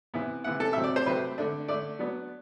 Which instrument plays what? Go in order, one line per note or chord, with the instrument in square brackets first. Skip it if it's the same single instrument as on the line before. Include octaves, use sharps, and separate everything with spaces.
[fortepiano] C3 E3 B3 E4
C3 E3 B3 E4 F#5
A4
C3 F#3 A3 C4 E5
D5
C5
C3 F#3 A3 C4 B4
D3 A3 D4
D3 A3 D4 D5
F#3 B3 D4